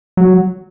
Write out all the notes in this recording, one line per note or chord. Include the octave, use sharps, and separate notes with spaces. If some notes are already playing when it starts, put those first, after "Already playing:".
F#3